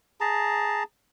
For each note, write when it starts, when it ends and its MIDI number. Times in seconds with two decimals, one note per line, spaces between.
0.21 0.83 68
0.21 0.83 81
0.21 0.83 82